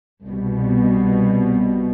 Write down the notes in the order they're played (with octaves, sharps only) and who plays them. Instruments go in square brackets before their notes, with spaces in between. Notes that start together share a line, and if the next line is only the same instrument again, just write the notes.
[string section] C2 B2 G3